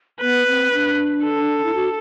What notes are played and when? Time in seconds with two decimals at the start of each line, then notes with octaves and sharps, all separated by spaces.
0.21 B3 B4
0.48 C4
0.73 D4
1.24 A4
1.65 E4
1.75 F#4